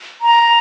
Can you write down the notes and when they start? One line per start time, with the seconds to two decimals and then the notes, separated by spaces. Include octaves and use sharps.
0.22 A#5